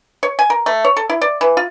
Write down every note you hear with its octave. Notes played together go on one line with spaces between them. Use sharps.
C#5
G#5
A#4
A3
C#5
A4
E4
D5
E3
F4